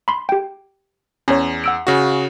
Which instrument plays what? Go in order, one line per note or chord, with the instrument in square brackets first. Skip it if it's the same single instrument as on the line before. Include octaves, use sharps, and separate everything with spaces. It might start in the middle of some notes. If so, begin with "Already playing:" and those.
[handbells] B5 C6
G4 G5
[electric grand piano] E2 [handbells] C#4 C#5
[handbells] F#5 E6 D7
[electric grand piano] C#3 F#4